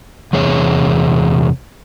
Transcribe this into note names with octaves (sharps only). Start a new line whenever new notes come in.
E2 C3 G#4 C#5